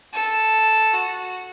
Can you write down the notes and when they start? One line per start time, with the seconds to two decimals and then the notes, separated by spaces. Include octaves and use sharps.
0.13 A4
0.93 F#4